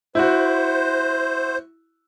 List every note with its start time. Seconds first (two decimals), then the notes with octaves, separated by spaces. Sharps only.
0.15 E4 F#4 C5